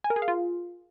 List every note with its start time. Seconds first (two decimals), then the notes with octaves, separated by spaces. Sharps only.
0.04 G#5
0.10 A#4
0.16 G#4
0.22 F5
0.28 F4